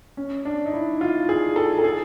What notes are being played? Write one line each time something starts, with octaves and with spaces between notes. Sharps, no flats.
C#4
D4
D#4
E4
F4
G#4
A4
A4
G#4